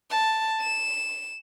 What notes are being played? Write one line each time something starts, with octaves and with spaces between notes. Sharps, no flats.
A5
E7